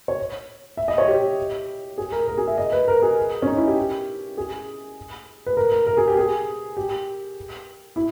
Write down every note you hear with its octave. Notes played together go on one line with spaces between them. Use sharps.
C#5
E5
D#5
C#5
G4
G#4
A#4
A#4
G#4
E5
D#5
B4
A#4
G#4
C#4
D#4
E4
G4
G#4
B4
A#4
A#4
A#4
G#4
G4
G#4
G4
E4